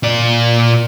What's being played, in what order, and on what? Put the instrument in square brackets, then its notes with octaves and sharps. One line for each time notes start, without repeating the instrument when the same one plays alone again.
[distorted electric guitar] A#2 D5